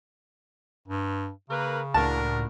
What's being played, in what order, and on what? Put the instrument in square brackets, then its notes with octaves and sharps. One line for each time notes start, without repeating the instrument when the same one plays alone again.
[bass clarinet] G2
[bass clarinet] C#3 [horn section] A#3 A#4 B4
[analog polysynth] C#2 A2 [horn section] D4 F#4 A#4 [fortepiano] A5